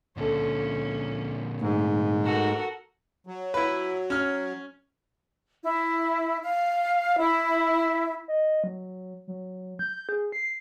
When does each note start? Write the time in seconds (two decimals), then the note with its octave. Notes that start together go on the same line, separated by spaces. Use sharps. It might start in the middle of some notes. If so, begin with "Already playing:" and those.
0.17 C#2 A#2 D3 C#4 A4
1.62 G#2 A3 D#4
2.24 F#4 A4 A#4
3.27 F#3
3.54 E4 B4
4.10 C#4 F6
5.64 E4
6.42 F5
7.18 E4
8.28 D#5
8.64 F#3
9.28 F#3
9.79 G6
10.09 G#4
10.32 C7